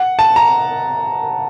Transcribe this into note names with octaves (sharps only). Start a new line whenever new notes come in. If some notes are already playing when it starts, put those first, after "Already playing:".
Already playing: F#5
A5
A#5